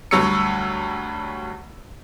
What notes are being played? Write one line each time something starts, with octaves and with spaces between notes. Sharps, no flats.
D2 F#3 G3 C#5 E6 C#7